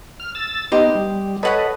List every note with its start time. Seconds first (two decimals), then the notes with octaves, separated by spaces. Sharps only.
0.20 F6
0.35 E6 A6
0.72 B3 D#4 G4 D#5 C6
0.95 G3
1.43 A4 B4 C#5 D#5 F#5 B5